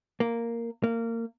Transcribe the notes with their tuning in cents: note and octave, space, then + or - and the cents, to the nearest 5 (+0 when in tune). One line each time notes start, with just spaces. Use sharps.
A#3 -5
A#3 -25